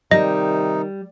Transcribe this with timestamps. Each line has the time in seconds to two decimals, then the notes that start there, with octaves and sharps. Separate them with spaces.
0.11 C3 D#3 G3 D#4 D#5